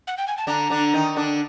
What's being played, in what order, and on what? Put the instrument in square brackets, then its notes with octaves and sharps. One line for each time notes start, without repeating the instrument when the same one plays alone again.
[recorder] F#5
G5
G#5
A5
[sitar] D3 D4 [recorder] A#5
[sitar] D3 D4
D#3 D#4
D3 D4